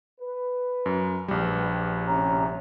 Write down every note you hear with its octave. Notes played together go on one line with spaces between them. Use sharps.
B4
F#2
A#1 G3
A2 C3 C#4 A#5